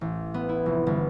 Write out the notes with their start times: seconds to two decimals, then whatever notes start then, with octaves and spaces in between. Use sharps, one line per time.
0.01 A1
0.34 B3
0.49 E4
0.66 F1
0.87 G1